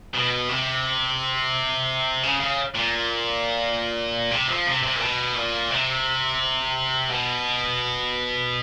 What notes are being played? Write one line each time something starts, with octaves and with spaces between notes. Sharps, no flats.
B2
C3
C#3
C#3
A#2
C3
F3
C3
C3
A#2
B2
A#2
C3
B2